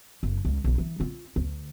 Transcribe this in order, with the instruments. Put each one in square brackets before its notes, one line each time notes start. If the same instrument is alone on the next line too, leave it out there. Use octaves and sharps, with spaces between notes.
[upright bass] F#1
C#2
B1 C#3
E3
C4 F4
D2